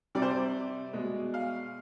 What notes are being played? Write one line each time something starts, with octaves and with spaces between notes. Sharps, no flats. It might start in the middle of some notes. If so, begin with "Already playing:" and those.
C3 G3 D5
C5
D5
B2 G#3
F5